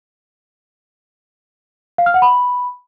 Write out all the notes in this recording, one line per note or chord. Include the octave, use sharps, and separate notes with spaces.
F5
F6
F#5
B5